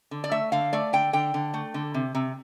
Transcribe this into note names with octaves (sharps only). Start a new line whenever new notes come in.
D3
D5
A3 E5
D3 F5
A3 D5
D3 G5
D3 G5
D3
A3
D3
C3
C3